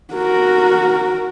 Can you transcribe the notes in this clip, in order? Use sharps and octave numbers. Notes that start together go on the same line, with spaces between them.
F#4 A#4